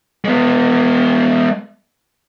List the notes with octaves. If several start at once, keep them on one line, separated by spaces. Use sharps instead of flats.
G#3 B3